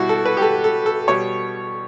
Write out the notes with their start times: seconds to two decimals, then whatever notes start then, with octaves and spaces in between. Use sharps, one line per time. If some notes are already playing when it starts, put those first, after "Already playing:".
Already playing: B2 G3 E4 F#4
0.09 A4
0.26 B4
0.37 G4
0.42 A4
0.64 A4
0.86 A4
1.08 B2 G3 C#5